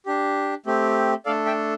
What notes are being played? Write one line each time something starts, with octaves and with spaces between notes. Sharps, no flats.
D4 G4
A3 C4 G4
A3 D4 A4 D5 F5
E5 G5